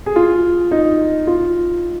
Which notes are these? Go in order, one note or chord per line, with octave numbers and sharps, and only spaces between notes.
G#4
F4
D#4
F4